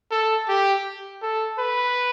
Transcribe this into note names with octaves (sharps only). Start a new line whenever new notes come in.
A4
G4
A4
B4